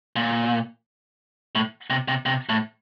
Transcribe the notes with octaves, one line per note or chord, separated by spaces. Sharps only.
A#2
A2
C3
C3
C3
A2